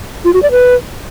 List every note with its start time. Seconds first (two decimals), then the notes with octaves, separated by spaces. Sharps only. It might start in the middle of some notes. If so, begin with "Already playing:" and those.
0.25 F4
0.34 F#4
0.43 D5
0.51 B4